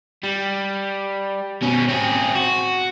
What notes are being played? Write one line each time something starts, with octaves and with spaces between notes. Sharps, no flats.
G3
B2 C#4
C4 G#4
F#4